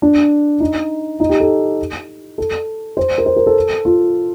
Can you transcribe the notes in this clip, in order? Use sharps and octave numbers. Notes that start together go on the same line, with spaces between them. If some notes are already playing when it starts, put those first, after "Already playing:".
D4
D#4
D#4
G4
A4
A4
C5
A#4
C5
A#4
A4
F4